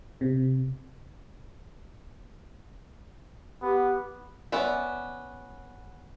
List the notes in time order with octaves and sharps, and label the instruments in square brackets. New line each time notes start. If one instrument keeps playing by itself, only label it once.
[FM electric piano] C3
[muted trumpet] B3 [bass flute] G4
[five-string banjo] B3 C#4 D5 E5